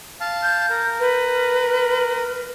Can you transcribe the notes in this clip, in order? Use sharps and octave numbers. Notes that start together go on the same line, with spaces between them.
F5 A5
G6
A#4
B4